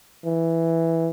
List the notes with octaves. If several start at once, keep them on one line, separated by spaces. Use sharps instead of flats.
E3